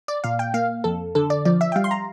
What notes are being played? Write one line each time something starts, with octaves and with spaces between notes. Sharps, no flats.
D5
A#2 F5
G5
A#3 F5
F2 A4
D3 A4
D5
F3 D5
E5
G5
G3 F5
C6
A#5